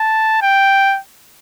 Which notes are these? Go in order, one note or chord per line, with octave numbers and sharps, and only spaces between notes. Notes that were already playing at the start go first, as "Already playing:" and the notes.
Already playing: A5
G5